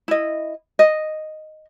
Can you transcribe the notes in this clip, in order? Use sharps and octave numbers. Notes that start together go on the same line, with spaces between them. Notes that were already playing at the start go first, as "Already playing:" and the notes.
E4 D#5
D#5